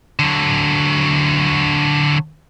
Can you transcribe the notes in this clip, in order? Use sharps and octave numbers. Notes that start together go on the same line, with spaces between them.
D3 F#3